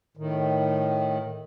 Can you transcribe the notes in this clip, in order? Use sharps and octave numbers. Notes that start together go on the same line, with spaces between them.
A2 D#3